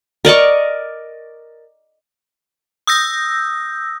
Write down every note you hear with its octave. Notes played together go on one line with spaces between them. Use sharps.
A#4 D5 D#5 C#6
D#6 E6 G6 A#6